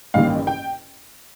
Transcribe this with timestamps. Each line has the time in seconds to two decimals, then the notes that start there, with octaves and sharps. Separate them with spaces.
0.14 A1 G2 D#3 A#3 F5
0.47 G5